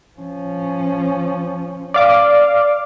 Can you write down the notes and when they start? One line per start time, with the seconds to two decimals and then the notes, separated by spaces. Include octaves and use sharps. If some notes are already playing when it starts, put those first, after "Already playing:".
0.17 F3 C#4
1.94 D5 F5 D6